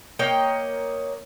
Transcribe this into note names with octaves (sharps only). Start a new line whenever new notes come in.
A#3 C#5 D#5 G5